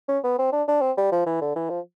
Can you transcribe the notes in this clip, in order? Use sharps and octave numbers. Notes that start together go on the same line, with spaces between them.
C#4
B3
C4
D4
D4
C4
G3
F3
E3
D3
E3
F3